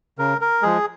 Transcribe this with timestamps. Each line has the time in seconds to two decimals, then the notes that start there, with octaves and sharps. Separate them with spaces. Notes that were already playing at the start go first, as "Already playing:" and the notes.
0.19 C#3 A#4
0.41 A#4
0.62 F3 G#3 G#4